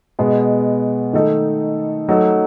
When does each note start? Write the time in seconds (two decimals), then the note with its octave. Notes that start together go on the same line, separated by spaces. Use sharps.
0.19 B2 G#3 B3
1.13 D#3 A3 D#4 A4
2.09 F#3 A3 D#4 A4